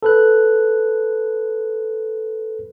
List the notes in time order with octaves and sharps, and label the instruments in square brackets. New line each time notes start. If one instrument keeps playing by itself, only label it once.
[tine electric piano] A4 B4 F#6